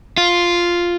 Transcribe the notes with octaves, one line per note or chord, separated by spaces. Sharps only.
F4